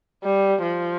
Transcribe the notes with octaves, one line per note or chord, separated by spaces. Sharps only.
G3
F3